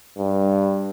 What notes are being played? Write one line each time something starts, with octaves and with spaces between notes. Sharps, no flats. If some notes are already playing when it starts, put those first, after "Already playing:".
G2